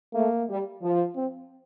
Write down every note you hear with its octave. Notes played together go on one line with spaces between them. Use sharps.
A3 A#3
G3
F3
C4